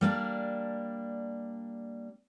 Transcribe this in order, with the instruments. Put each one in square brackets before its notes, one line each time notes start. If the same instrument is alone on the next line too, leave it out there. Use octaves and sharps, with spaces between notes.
[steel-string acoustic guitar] G3 A#3 C4 D4